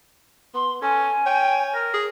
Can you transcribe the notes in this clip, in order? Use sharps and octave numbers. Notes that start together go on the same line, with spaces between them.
B3 C6
C#4 A4 G#5
C#5 G5
A#4
G#4